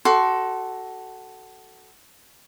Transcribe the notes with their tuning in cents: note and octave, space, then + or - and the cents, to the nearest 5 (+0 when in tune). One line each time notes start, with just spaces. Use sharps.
F#4 +20 A4 +0 C6 +10